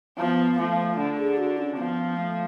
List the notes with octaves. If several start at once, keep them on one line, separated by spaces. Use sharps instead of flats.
F3 B3
F3 A3
D3
G#4
F#4
C#4
F3 B3
A3